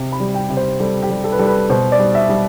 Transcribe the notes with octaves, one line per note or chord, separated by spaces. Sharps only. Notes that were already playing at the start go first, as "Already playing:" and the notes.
Already playing: C3
B5
G3
G5
C3
C5
G3 A4
G4
G3
A4
B4
G3 A4
B4
B2 C5
D5
G3
E5
G3